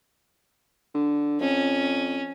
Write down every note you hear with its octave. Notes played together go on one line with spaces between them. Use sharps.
D3
F2 C#4